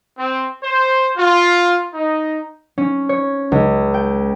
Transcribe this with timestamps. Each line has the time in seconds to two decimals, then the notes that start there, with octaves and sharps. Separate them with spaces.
0.18 C4
0.63 C5
1.17 F4
1.94 D#4
2.78 C#4
3.09 C#5
3.52 C#2
3.94 G5